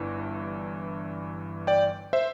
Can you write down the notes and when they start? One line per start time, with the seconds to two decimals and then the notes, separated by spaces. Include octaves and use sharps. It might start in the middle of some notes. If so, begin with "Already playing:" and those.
Already playing: G1 G2 E3
1.67 D5 G5
2.13 C5 E5